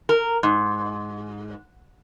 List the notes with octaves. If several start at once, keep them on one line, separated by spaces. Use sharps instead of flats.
A#4
G#2